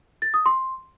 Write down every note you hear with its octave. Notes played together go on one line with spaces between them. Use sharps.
A6
D#6
C6